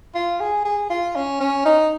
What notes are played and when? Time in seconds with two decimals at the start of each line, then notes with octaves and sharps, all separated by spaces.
0.15 F4
0.40 G#4
0.65 G#4
0.90 F4
1.16 C#4
1.40 C#4
1.65 D#4